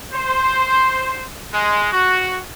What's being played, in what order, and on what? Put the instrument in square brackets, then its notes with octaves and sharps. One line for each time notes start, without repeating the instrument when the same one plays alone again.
[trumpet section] C5
G#3
F#4